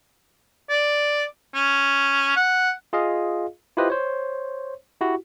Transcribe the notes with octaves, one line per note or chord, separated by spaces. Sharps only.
D5
C#4
F#5
F4 G#4 D#5 F5
E4 F4 G4 B4 C5 D#5
C5 C#5
E4 F#4 G4